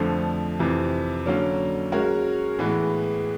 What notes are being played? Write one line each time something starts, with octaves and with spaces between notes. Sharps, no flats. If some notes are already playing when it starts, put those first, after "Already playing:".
Already playing: F2 D3 F3 A3
F2 C3 E3
D3 F#3 A#3 C#4
G#3 C#4 F#4 A#4 C#5
A2 E3 G#3 B3